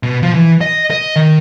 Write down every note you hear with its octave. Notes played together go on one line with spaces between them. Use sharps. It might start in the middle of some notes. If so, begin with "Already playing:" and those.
B2
F3
E3
D#5
D#5
D#3